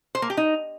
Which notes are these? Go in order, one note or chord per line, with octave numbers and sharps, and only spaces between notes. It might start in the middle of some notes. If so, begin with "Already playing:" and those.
C5
A#3
G4
D#4